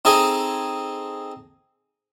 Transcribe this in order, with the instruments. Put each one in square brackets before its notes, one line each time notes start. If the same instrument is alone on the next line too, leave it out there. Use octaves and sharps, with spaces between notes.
[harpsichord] C4 D#4 G#4 A4 D#5 G#5